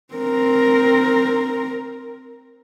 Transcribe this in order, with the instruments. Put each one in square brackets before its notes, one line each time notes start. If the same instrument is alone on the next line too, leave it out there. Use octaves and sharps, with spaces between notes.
[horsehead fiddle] C4 A#4